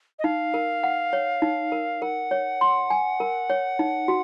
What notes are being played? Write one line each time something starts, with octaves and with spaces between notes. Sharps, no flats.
D#5
D#4 F5
A#4
F#5
C#5
D#4
A#4
A#4 F#5
C#5
C6
G#5
A#4
C#5
D#4
F#4